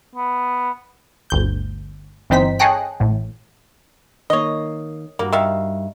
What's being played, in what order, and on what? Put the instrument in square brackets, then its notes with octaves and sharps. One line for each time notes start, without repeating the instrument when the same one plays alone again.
[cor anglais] B3
[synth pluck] G1 D2 G6
G1 E3 C4 D#4 C5 B6
G#4 A4 C#5 D#5 G5 F#6
A1 A2
[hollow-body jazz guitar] D#3 A#3 [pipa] C#5 D#5
[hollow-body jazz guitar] G2 G3 F#4 [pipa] A#3
[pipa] D#3 E5 F5